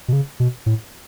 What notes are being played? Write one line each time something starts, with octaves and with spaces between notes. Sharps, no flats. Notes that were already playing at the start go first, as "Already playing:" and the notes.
B2
C#3
B2
A2